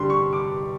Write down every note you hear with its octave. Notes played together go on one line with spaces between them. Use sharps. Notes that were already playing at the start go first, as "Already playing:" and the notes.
Already playing: G2 D3 G3 C6
C#6
D6